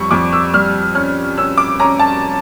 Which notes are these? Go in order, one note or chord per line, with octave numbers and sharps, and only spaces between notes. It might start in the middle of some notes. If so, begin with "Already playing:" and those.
Already playing: F2 G3 C#6
F2 D6
E6
G3 F6
C#4 F6
C#4 E6
D6
C#4 A#5
A5